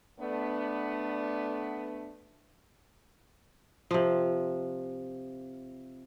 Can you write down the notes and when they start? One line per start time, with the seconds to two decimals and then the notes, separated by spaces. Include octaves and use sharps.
0.20 A3 B3 D4
3.91 C3 F3